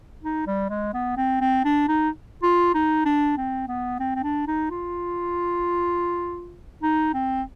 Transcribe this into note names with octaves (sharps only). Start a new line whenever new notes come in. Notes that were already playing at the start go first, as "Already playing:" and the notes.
D#4
G3
G#3
B3
C4
C4
D4
D#4
F4
D#4
D4
C4
B3
C4
C4
D4
D#4
F4
D#4
C4